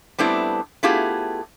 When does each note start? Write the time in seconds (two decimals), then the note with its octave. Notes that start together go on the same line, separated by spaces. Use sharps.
0.18 G3 A3 B3 C4 D4 E4
0.83 A3 B3 E4 F4 G4 G#4